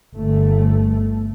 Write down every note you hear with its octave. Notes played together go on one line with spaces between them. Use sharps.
G1 A3